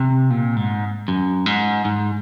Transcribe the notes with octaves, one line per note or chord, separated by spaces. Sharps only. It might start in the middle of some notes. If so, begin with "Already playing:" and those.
Already playing: C3
A#2
G#2
F#2
G#2
G#2